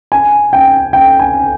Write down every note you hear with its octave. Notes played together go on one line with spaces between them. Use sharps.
G#5
G5
G5
G#5